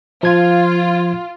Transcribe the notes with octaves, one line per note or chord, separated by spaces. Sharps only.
F3 F4 G#6